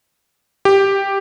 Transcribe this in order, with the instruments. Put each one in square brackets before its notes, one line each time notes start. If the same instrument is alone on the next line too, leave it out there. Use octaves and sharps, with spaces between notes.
[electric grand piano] G4